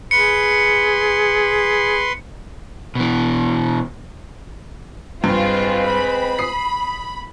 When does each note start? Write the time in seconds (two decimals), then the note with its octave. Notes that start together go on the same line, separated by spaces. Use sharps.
0.11 G#4 B4 C6 C#7
2.95 B2 E3
5.24 G2 G#3 C4 F4 B4
5.87 B5
6.39 D#6 C7